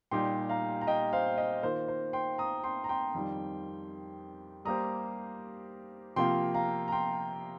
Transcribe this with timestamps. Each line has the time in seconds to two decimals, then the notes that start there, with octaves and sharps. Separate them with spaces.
0.11 A#2 G3 D#4 G4 G5 C6
0.49 F5 A#5
0.81 A#5
0.87 D#5 G5
1.13 C5 F5
1.38 D#5
1.63 D#3 A#3 F4 A#4 C5
1.88 C5
2.13 G5 C6
2.38 A#5 D#6
2.64 G5 C6
2.84 A#5
2.89 G5 C6
3.14 F2 D#3 G3 D#4
4.65 G3 A#3 G4 C5 A#5 D#6
6.16 C3 F3 A#3 F4 G5 C6
6.54 F5 A#5
6.88 A#5
6.92 G5 C6